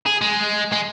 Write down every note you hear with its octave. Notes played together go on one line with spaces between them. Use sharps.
G#4
G#3
G#3